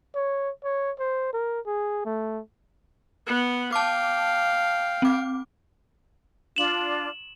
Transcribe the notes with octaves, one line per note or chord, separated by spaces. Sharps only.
C#5
C#5
C5
A#4
G#4
A3
B3 F#5
F5 G5 A5 D6
C4 D6
D4 F4 E7 F#7